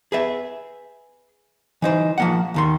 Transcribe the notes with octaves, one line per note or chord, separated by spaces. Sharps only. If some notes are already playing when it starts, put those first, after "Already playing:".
G#4 B4 E5
E3 D#4 C5
F3 A#3 F#5
D#2 D#3 C6